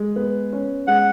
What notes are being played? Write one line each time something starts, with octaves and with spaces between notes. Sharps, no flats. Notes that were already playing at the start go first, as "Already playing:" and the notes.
Already playing: G#3
B3
C#4
G#3 F#5